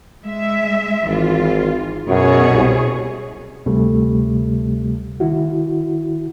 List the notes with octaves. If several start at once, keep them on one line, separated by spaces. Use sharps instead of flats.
G#3 E5
G#1 E3 F4
F#2 B2 G#4 C#5
C2
D2 C3 G3 A3
D#3 E4 F#4